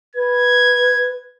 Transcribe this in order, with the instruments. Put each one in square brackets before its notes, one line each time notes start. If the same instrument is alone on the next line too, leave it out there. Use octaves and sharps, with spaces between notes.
[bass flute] B4 [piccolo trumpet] G#6